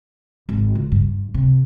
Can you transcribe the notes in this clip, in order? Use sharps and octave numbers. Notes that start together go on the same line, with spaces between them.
G#1
C#2
G2
C3